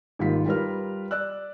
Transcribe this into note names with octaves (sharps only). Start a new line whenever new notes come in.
G#1 G3 A#3 F4 B6
G3 F4 A#4 B4 F6
D5 E6 F#6